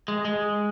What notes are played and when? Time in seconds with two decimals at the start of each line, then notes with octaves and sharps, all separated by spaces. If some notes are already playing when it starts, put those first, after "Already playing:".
0.08 G#3
0.25 G#3